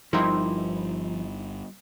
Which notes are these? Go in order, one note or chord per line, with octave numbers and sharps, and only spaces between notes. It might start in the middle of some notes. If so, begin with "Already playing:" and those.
G1 F3 G3 A#3 C4 D#4 E4